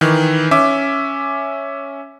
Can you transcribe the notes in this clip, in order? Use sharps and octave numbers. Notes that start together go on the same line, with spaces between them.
D#3 E3
C#4 E5 D6